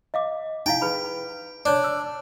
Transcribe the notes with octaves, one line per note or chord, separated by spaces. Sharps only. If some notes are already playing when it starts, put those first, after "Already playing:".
D#5 F5 D6
D#4 E4 F5 G5
G#4 B4 B5
D4 C#5 D5
E6